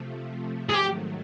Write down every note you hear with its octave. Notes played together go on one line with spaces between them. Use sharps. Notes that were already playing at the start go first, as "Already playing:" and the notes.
Already playing: C3 F3 A3
G#4
G#2 D#3 F#3 A3 G4